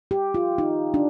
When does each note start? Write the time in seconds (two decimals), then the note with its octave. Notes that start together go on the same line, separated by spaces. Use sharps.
0.11 G4
0.34 F4
0.58 D#4
0.94 D4